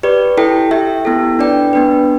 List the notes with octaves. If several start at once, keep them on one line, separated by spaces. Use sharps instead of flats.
G4 B4 D5
E4 A4 G5
G4 E5 G5
B3 E4 A4
D4 B4 D5 G5
B3 D4 B4